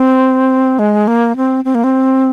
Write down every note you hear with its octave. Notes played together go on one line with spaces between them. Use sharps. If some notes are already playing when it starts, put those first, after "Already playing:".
Already playing: C4
G#3
A#3
C4
C4
A#3
C4